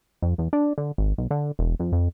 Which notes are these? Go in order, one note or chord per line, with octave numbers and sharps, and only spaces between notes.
F2
E2
D4
D3
G#1
B1
D3
E1
F2
F2